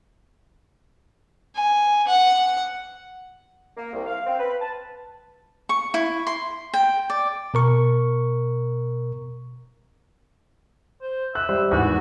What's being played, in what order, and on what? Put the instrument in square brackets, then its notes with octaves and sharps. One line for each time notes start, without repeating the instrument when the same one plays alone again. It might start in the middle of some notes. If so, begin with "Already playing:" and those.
[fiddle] G#5
F#5
[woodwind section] A#3
C2
F5
C4
B4
A5
[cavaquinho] C#6
E4
C6
G5
D5
[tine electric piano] B2 A#4 C#6
[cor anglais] C5
[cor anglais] E5 [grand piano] F#6
[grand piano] G3 C5
[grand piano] G#1 E2 [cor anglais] F#4